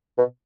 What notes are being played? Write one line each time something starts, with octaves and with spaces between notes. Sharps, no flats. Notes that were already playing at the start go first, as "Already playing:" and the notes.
B2